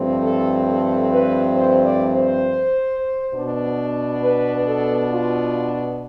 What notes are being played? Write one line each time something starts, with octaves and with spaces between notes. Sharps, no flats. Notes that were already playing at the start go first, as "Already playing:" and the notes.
Already playing: G2 F3 A3 C4
A4
A4
B4
C5
D5
C5
B2 B3 D4
B4
A4
F4